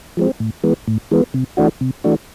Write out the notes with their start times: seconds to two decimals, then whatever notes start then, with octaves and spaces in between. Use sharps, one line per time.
0.17 F3 G#3 C4
0.40 A2
0.64 E3 G#3 B3
0.88 A2
1.11 E3 G#3 B3
1.34 C3
1.57 E3 A3 D4 F#4
1.81 C3
2.04 E3 A3 D4 F#4